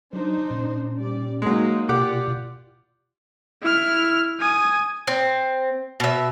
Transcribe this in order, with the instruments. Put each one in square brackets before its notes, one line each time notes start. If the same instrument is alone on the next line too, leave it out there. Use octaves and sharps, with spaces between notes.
[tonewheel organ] F#3 [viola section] D4 D#4 C5
[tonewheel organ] A#2 C#4
[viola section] G3 D5
[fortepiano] F#3 G#3 [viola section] A#3 D#4
[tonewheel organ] B2 [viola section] F4 D5 [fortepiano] G4 F#5 D6
[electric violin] E4 F6
G#5 D#6
[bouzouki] C4
B2 E5